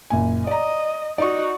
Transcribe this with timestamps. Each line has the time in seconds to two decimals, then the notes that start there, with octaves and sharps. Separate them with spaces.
0.10 F#1 A#2 G#5
0.47 D5 D#5 A#5
1.18 D#4 F#4 D5 D#5 C#6